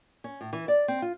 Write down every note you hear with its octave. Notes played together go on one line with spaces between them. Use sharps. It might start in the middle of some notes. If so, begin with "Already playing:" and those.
C#4
A2
E3
D5
C4
F4